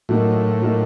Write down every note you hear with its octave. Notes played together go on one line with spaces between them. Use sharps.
A2 F#3 A#3 D#4 F#4
F#3 A#3 D#4 F#4